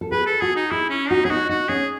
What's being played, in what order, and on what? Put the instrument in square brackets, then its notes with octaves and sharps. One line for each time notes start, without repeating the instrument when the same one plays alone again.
[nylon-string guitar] A4
[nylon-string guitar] G#4 [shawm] B4
[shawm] A4
[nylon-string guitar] F#4 [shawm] G#4
[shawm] D#4
[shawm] E4 [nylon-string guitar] G#4
[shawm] C#4
[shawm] D#4 [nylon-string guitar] F#4
[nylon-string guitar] C#4 [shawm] G#4
[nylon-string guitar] D#4 [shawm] F#4
[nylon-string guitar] D#4 [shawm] F#4
[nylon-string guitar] C#4 [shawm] G#4